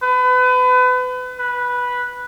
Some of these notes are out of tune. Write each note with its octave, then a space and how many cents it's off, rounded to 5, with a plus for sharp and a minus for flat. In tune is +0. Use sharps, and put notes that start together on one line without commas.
B4 +30
B4 -10